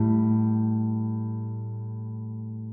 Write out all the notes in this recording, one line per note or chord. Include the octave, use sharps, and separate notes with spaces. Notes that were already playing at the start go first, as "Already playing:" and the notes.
Already playing: A2 G3